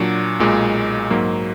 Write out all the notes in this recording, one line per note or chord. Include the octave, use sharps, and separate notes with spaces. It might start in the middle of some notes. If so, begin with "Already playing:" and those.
Already playing: A#2 F#3 D4 F#4
B1 A#2 G#3
G#2 F#3 A#3